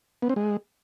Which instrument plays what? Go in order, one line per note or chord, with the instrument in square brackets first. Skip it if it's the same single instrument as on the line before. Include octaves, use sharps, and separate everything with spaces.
[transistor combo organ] B3
C4
G#3